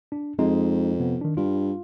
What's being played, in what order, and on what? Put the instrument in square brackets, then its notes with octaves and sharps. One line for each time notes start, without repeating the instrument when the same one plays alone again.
[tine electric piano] D4
[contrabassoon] F2 [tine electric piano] G#3 C4 D#4
[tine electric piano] C3 B3
D#3 D4
[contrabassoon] G2 [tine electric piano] F4